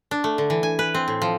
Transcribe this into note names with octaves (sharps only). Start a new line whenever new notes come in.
D4
A3
D3
E3
G#5
B4
C4
A2
F3